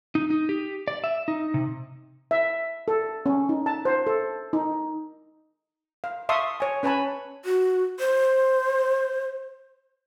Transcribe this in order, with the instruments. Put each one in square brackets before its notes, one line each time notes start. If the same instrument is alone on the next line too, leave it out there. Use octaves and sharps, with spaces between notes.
[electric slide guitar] D#4
D#4
G4
D5
E5
D#4
C3
[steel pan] E5
A4
C#4
D#4
A5
C5
A4
D#4
F5
E5 F5 A5 C6 C#6 D#6
C#5 G#5
C#4 B4 C#5 G#5 A5 B5
[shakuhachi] F#4
C5